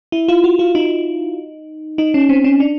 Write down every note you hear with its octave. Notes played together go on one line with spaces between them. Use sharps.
E4
F4
F#4
F4
D#4
D#4
C#4
C4
C#4
D4